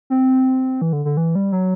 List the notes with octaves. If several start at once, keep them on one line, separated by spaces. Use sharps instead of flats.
C4
E3
D3
D3
E3
G3
F#3